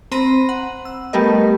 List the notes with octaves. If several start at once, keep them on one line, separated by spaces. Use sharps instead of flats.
C4 C5 A#5 B5 A#6 D#7
F#5
E6
G3 A3 B3 G4 A#4 D#5